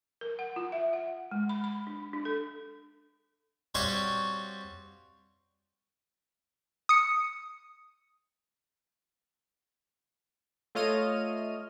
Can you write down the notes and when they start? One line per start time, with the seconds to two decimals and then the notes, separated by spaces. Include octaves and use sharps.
0.21 A#4
0.39 F#5
0.56 F4
0.72 E5
0.93 F#5
1.31 G#3
1.49 B5
1.64 B5
1.87 D4
2.13 D4
2.25 A4
3.75 G3 C4 F#4 G4 C#5 F5
6.89 D#6 C#7
10.75 A3 F4 C#5 D#5 F6 D#7